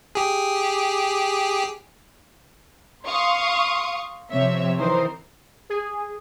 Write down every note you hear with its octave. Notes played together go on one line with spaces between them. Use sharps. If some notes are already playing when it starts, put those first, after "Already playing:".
G4 G#4
F5 C6 C#6 D#6
C3 F3 C4 C#5 E5
D#3 E3 D#4 A#4 C5
G#4